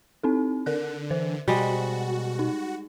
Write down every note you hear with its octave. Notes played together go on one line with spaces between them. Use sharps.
C4 D#4 A4
D3 A#4 D5 F#6
E3 C5
B2 G3 G#3 F#4
D#4